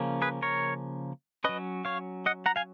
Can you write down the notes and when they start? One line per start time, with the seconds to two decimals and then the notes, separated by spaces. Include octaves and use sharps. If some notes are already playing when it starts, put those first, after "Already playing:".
Already playing: C#3 F3 A#3 C#4
0.22 G#4 B4
0.42 A#4 C#5
1.44 F#3 C#4 B4 D#5
1.85 C#5 F5
2.26 D#5 F#5
2.46 F#5 A#5
2.56 F5 G#5